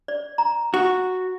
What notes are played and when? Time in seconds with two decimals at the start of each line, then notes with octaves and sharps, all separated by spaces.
0.08 D5
0.38 A#5
0.74 F#4